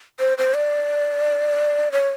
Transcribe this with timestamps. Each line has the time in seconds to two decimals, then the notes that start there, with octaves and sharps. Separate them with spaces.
0.20 C5
0.38 C5
0.54 D5
1.92 C#5